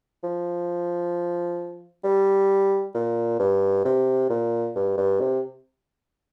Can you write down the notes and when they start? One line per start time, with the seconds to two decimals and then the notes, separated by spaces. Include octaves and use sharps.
0.23 F3
2.04 G3
2.94 A#2
3.39 G2
3.85 C3
4.29 A#2
4.75 G2
4.97 G2
5.20 C3